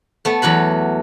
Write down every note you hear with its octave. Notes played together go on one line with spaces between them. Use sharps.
A3 B3
E2 F#3 B4 B5